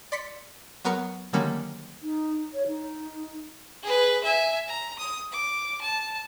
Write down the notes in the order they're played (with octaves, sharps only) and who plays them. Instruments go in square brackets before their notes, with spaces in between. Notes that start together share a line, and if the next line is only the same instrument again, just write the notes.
[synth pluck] D5 C6 B6 C#7
F#3 B3 A#4 C#6 C#7
D3 D#3 F#3 G3 A#3 C#4
[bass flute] D#4
C#5
D#4
[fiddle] G#4 B4
E5 G#5
A#5
D#6
D6
A5